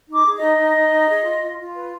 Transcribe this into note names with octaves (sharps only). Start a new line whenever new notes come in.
D#4
D6
G#4
D#5
D#4
D#4
D#4
D#4
G#4
F4
F4
F4
B4